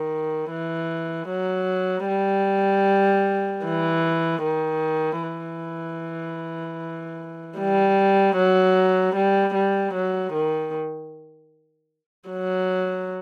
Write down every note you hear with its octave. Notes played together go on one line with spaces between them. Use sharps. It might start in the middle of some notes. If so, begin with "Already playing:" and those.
Already playing: D#3
E3
F#3
G3
E3
D#3
E3
G3
F#3
G3
G3
F#3
D#3
F#3